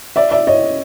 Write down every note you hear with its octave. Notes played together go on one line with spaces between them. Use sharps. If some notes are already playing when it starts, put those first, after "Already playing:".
D5 E5
D5 E5
C#5 D#5